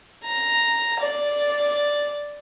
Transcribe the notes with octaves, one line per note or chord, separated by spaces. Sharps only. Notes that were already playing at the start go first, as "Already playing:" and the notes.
A#5
D5